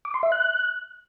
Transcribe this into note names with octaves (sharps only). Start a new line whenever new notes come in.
D6
C6
E5
F#6